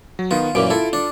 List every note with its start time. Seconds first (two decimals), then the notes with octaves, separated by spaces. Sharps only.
0.19 F#3
0.31 D#3 B3 F4
0.55 F#2 A#2 E3 C#4 D6 D7
0.70 E4 F4 A4
0.93 D4